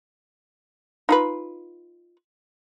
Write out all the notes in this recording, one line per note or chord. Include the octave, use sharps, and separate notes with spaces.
D#4 F4 B4